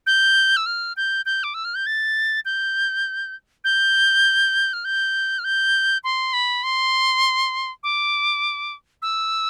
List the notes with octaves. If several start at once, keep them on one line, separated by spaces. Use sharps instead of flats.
G6
E6
F6
G6
G6
D6
E6
F6
G6
A6
G6
G6
F6
G6
F6
G6
C6
B5
C6
D6
E6